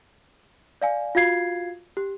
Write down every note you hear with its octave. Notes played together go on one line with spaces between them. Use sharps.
D5 F5 G#5
F4 F#4 F5 G#6 C7
G4